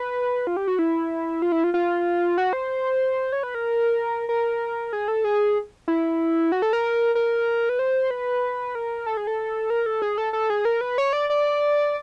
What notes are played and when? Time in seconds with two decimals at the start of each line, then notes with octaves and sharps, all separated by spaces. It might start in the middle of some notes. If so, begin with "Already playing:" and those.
Already playing: B4
0.47 F4
0.57 G4
0.68 F#4
0.79 E4
1.42 F4
1.52 E4
1.64 F4
1.74 F4
2.38 F#4
2.53 C5
3.32 C#5
3.43 B4
3.55 A#4
4.29 A#4
4.93 G#4
5.08 A4
5.24 G#4
5.88 E4
6.52 F#4
6.62 A4
6.73 A#4
7.15 A#4
7.69 B4
7.79 C5
8.11 B4
8.75 A#4
9.06 A4
9.17 G#4
9.27 A4
9.70 A#4
9.86 A4
10.02 G#4
10.18 A4
10.33 A4
10.50 G#4
10.65 A#4
10.81 B4
10.98 C#5
11.13 D5
11.30 D5